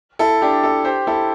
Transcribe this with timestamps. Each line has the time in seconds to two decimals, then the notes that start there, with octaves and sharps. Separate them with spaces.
0.19 E4 A4
0.41 D4 G4
0.63 E4 A4
0.84 G4 C5
1.07 E4 A4